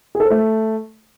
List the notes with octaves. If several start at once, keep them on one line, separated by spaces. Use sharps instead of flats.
G#4
A4
C5
A3